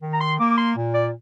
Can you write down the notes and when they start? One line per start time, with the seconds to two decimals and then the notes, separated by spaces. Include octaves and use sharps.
0.02 D#3
0.13 A#5
0.21 C6
0.38 A#3 D6
0.50 D6
0.57 C6
0.75 A#2
0.93 D5